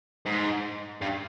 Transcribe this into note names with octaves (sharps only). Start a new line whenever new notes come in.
G#2
G2